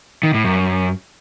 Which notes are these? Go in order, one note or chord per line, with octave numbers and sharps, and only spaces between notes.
D#3
A2
F#2